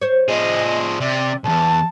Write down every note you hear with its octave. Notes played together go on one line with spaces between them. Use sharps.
C5 C#5
F3 G#4 D#5
C3 D5
B1 E2 A5